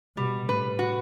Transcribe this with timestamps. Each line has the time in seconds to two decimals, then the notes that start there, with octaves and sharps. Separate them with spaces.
0.17 B2 G3
0.48 A2 B4
0.79 F#4